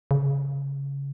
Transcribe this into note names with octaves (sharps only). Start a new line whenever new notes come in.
C#3